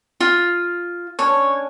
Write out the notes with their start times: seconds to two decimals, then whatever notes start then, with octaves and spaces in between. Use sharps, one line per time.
0.20 F4
1.19 C#4 D4 C#5